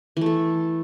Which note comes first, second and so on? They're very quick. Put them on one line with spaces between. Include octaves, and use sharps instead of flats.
E3 A3 A4